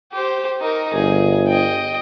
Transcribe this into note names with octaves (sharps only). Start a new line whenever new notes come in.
G4 C5
D#4 A#4
G1 G#4
D#5 G5